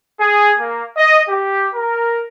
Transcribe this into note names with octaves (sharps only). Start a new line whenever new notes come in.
G#4
A#3
D#5
G4
A#4